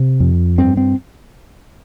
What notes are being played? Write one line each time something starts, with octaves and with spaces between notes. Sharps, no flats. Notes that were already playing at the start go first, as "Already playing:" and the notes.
Already playing: C3
F2
G2 C4
C4